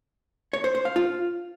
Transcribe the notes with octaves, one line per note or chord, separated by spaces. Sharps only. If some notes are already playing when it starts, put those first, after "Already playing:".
C#5
C5
C5
F5
F4